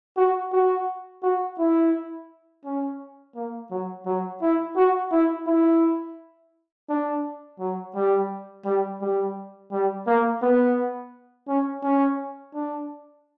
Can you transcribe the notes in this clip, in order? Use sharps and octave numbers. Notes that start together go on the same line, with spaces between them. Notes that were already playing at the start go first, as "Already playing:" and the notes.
F#4
F#4
F#4
E4
C#4
A#3
F#3
F#3
E4
F#4
E4
E4
D4
F#3
G3
G3
G3
G3
A#3
B3
C#4
C#4
D4